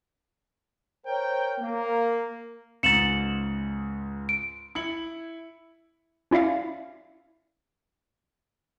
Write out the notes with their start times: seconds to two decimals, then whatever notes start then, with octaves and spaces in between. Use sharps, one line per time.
1.06 A#4 C5 C#5 G5
1.59 A#3
2.83 C#2 G#2 A6 C#7 E7 F#7
4.29 D7
4.75 E4 C#7 F#7
6.31 C#4 E4 D5 E5 F5